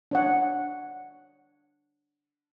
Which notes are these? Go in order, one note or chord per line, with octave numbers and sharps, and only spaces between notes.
D4 C#5 F#5